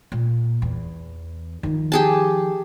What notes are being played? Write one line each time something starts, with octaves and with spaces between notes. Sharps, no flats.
A#2
E2
D#3 F3
G4 G#4 A5